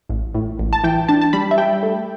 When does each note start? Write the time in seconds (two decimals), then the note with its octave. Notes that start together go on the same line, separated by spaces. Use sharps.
0.09 A1
0.34 A2
0.59 A1
0.73 A5
0.84 E3 G5
1.09 D4 A5
1.21 A5
1.33 G3 B5
1.51 E5
1.58 G3 G5
1.83 A3